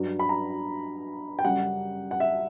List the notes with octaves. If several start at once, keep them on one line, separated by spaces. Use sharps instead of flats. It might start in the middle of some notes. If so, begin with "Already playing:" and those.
Already playing: G2 F#3
B5
A#5
G5
F#2 C#3 G3 F#5
F#5
E5